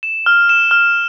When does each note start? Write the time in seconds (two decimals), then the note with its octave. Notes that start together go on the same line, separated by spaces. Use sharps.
0.03 E7
0.26 F6
0.49 E7
0.71 F6